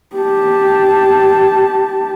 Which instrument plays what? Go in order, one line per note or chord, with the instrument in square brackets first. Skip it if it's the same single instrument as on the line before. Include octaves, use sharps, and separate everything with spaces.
[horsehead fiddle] G4 A5